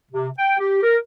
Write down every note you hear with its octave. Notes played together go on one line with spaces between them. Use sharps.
C3
G5
G4
A#4